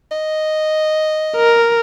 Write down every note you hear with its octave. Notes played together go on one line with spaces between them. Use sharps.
D#5
A#4